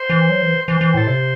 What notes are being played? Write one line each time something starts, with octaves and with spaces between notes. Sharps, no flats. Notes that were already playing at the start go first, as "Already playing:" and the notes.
Already playing: C5
E3
F#3
E3
E3 C5
E3
A2 A4
C3 C5